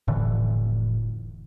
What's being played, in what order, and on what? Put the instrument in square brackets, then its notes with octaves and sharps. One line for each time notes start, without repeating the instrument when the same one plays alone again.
[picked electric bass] F1 A2 D3 E3